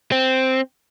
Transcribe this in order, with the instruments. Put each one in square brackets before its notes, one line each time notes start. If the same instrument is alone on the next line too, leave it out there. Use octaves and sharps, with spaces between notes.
[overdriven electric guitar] C4